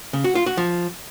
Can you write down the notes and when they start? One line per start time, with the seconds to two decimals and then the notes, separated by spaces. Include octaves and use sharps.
0.13 C#3
0.24 F#4
0.35 F4
0.46 F#4
0.57 F3